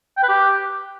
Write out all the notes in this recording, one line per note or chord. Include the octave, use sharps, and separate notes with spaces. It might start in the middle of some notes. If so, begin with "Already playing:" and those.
G5
B4
G4